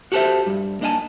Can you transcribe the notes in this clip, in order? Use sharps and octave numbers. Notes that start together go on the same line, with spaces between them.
F#4 G4 A4 A#4 C5 E5
G2
A#3 D4 D#5 F#5 G#5 A5